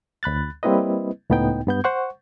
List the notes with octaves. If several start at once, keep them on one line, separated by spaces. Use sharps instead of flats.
D2 B5 F#6 A6
G3 A#3 C4 E4 B4 D#5
C#2 A2 B3 D#4 G5
G2 B3 G6
C5 F#5 C#6